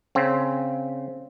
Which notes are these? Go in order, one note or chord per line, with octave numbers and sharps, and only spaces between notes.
C#3 C4